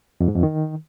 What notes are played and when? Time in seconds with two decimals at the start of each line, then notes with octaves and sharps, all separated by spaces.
0.20 F2
0.28 G#2
0.36 F2
0.43 D#3